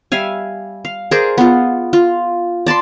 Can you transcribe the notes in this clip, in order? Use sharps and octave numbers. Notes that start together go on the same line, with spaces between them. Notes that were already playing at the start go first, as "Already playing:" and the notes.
G3 E5 F5 G#5
F5
G#4 A#4 C5 D5
B3 F4
F4
D5 A5 B5 C6